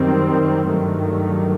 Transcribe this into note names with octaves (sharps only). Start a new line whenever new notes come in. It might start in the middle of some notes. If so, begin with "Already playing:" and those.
Already playing: F#2 D#3 G3 C4
G2 D#3 F#3 A3